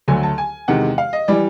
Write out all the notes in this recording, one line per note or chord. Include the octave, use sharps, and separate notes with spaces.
D2 D3 F#3 A3 G#5
A5
G#5
E2 C3 D#3 G#3 F#5
F5
D#5
E3 G3 D5